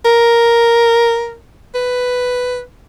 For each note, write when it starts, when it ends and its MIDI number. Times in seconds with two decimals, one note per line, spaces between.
0.05 1.35 70
1.75 2.61 71